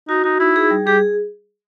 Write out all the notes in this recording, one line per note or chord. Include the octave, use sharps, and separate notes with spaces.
D#4 F#4
D#4 F#4
D#4 E4
G#4
G3
G4 G#4